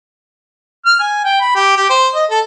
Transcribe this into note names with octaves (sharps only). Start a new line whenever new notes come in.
F6
G#5
G5
B5
G4
G4
C5
D#5
A4